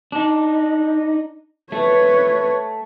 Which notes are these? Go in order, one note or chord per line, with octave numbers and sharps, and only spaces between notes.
D4 D#4
A3 B4 C#5